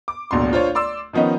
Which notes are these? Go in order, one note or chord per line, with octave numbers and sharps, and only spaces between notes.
D6
D1 A#1 B2 D4 C6
D4 F4 C5 C#5
D5 C6 D6 E6
D#3 F3 B3 C#4 D#4